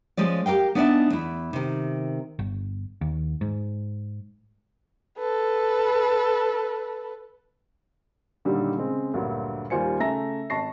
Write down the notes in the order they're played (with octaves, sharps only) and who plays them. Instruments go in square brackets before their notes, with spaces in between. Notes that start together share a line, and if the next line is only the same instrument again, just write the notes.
[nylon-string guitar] F3 G#3 C#4 D5
G4 A#4 F5 G5
B3 D4 D#4 D5 E5 A5
E2 E4
C3 D#3
[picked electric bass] G1
D#2
G#2
[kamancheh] A4 B4
[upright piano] A#2 D3 D#3 F#3 G3
C#3 G#3 C4
D2 G2 A#2 F#3
D#2 G3 F4 C5 G#5 C#7
C#3 A3 E5 G#5 A#5 A#6
G#1 A5 C#6 A#6 C7